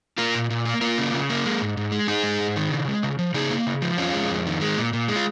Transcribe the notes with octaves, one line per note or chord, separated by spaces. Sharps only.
A#3 F4 A#4
A#2
A#2
A#3
A#3 F4 A#4
C#3
C#3
A#3
G#3
G#2
G#2
G#3
G#2 D#4 G#4
G#3
G#2
D#3
C#3
G#3
C#3
F3
C#3 D#4 G#4
A#3
C#3
F3
F2 C#4 F4
G#3
F2
D#3
G#3
A#2
A#2
G#3
F4